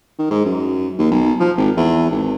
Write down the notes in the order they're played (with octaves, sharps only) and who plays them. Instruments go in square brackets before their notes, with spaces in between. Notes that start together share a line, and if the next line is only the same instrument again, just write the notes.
[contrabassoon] D#3
G#2
F#2
D#2
B1
F3
G#1
E2
G#1